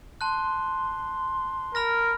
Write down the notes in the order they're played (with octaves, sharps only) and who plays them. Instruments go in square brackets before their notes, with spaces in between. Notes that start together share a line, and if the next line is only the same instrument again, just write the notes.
[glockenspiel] A5 F#6 [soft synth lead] C6
[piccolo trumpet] A#4 [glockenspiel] B5 F6 A#6